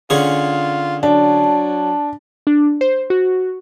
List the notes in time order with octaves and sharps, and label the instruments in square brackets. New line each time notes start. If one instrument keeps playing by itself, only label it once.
[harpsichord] D3 C#4 G#4 [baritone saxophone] F4
[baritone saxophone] F#3 [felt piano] D4 [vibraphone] A5
[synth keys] D4
C5
F#4